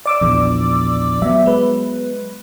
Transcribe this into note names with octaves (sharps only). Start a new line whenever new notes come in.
D5 D6 E6
A#1 E2
F#3 B3 E5
G#3 B4